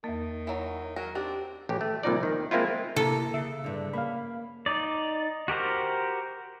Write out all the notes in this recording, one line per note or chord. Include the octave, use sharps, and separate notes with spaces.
E2 D#3 A#3
E3 F#3
F#3 A#4
C4 D4 D#4 G4
A1 G4
A3
C2 A#2 F3 D#4 D5
D#2 D#3
G#3 A#3 C4 E4 F4
C3 A#3 E4 A4 A#5
C#3 E5
G2 D3
A#3 C#4 F5 B5
D#4 D5
F#4 G4 A#4 C5